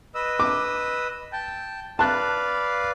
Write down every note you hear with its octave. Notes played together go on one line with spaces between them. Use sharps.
B4 D#5 E6
D6
G5 A5
B4 D5 F5 A5 F#6